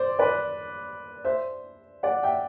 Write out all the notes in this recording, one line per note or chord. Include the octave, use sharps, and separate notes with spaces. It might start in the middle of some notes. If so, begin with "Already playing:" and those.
Already playing: C5 D5
B4 D5
C5 E5
D5 F#5
E5 G5